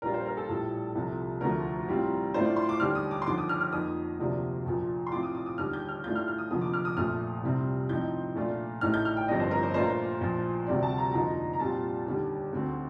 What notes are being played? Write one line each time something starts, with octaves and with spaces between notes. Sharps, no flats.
A#1 A#2 G3 D4 F4 A#4
C5
A#4
A4
A#1 A2 G3
C2 C3 F3
D2 D3 F3 A3 A#4
A2 G3 C4 F4
A2 A3 D4 F4 C5
D5
C6
D6
D#2 D3 G3 D4 F6
D#6
D6
C6
D#2 D3 F3 D6
D#6
F6
F6
F2 D#3 A#3 D#6
D2 C3 F3 A#3 D4
A#1 A#2 F3 A#3
C6
A2 F3 C4 F4 D6
D#6
D6
D#6
D#2 D3 G3 F6
G6
F6
A2 A3 D4 F4 G6
F6
F6
D#6
F1 F2 D3 F3 A#3 D#6
D6
F6
D#6
A#1 A#2 F3 A3 F6
C2 C3 G3 C4
A2 F3 C4 D#4 G6
A#2 A3 D4 F4
A1 A2 A3 D#4 F6
G6
F6
G5
G1 G2 F3 C4 D#5
C5
A#4
C5
A#2 A3 D4 F4 C5
A#4
C5
A#1 A#2 F3
D2 C3 G3 C4 D5
A5
A#5
F2 D3 F3 A#3 D#4 A#5
A#5
A#2 G3 C4 F4 A5
D#2 D3 G3
D2 D3 A3 C4